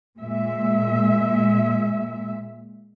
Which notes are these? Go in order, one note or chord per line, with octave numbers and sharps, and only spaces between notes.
A#2 G#3 E5